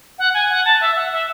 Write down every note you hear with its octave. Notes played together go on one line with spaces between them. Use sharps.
F#5
G#5
F#5
A5
E5
F#5
E5